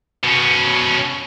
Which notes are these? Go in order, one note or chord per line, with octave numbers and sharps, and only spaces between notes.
B2 C#4